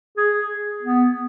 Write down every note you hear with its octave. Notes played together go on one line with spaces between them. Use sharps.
G#4
B3